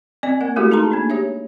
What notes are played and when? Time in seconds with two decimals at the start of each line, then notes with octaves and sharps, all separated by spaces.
0.23 C4 D5 D#5 G#5
0.41 A#3 A#4 F#5
0.56 G#3 A3 E4 F#4 G4 A4
0.70 A3 D#4 G#4 A5 A#5 C6
0.92 A#3 D4
1.10 G4 C#5 E5